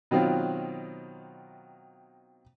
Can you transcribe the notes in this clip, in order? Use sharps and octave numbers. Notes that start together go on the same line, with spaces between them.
B2 D#3 F#3 C4 F4